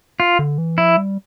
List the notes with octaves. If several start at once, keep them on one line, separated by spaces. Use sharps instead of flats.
F4
D3
E3
F3 E4
G3